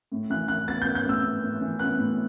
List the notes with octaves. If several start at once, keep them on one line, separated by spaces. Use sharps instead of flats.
A2
E3 F#6
E3 F#6
B3 A6
G6
B3
G6
A2 E6
B3
A2
E3
B3 F#6
A2